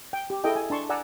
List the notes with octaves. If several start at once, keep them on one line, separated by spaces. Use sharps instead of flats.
G5
G4
E4 G#4 A4 D#5 G5
G#5
D4 A5 C6 C#6
D5 F#5 G#5 A#5 E6